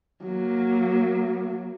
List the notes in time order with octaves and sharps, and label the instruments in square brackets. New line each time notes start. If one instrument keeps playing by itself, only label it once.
[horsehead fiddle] F#3 A#3